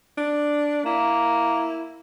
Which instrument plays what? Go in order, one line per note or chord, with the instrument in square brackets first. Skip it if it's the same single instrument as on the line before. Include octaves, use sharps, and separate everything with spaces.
[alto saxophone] D4
[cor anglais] A#3 [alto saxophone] E4